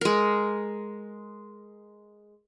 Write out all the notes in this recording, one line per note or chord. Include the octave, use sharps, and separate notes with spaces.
G#3 A#4